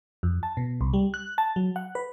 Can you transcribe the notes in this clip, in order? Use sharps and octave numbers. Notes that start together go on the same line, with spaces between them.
F2
A5
B2
C2
G3
F#6
A5
F#3
F#5
B4